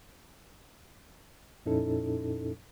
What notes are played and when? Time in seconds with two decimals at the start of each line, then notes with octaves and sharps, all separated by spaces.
1.66 F2 A#2 C#4 D#4 E4 A4